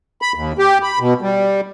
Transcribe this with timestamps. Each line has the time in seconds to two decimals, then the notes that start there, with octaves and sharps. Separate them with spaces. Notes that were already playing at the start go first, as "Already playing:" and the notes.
0.22 B5
0.35 D#2
0.59 G4
0.83 B5
0.99 B2
1.22 G3